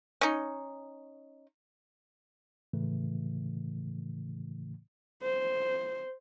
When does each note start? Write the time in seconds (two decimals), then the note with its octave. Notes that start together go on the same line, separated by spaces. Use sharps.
0.21 C#4 D#4
2.73 A2 C#3 E3 A3
5.23 C5